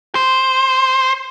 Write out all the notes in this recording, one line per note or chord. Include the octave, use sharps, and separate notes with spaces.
C5